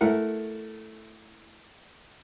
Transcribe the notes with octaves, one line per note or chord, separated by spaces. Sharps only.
A3 E4 A#4 F#5